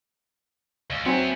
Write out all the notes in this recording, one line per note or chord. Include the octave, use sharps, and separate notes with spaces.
C#2
F#3 B3 C4 E4 G#5